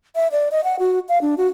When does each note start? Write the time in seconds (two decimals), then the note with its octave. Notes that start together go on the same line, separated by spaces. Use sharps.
0.16 E5
0.32 D5
0.51 D#5
0.64 F#5
0.79 F#4
1.09 F5
1.22 D4
1.38 F#4